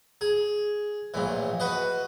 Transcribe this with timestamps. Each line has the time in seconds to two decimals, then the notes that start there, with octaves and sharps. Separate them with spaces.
0.21 G#4
1.14 A#1 A2 E3
1.60 F#4 B4 D#5